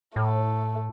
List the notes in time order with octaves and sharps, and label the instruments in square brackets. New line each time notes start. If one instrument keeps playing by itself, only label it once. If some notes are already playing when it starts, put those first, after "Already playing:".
[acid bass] A2 [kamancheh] A3